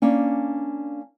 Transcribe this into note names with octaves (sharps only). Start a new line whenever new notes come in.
A#3 C#4 D4